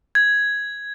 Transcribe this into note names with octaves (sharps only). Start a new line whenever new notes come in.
G#6